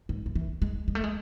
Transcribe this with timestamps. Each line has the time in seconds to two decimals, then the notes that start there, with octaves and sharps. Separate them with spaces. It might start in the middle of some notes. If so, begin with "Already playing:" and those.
0.09 G#2
0.26 F3
0.35 E3
0.62 G#3
0.88 G#3
0.95 A3
1.04 G#3